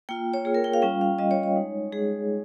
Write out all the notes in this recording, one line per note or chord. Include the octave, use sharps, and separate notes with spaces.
A#3 F4 G5
C#5
A#3 F4 G#4
A#4
G5
F5
G3 C#4 F4 G5
F5
G3 C#4 F4 D#5
C#5
C#5
G#3 D#4
G#3 D#4 G#4